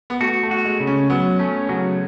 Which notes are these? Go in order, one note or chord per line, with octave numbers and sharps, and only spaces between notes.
B3
A3 F#4
A3
F#4
G#3
C#3
C#4
F#3 B3
A3 C#4
C#3 F#3